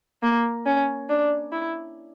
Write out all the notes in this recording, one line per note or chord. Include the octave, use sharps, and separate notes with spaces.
A#3
C#4
D4
E4